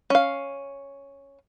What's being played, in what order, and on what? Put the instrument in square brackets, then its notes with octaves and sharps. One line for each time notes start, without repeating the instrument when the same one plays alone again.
[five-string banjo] C#4 F5